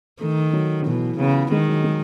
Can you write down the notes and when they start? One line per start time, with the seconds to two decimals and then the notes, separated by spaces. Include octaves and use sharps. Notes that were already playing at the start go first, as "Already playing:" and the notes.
0.21 D#3 A3
0.53 F#3
0.86 B2 E3
1.19 C#3 B3
1.52 D#3 G#3
1.69 F#3
1.84 G#3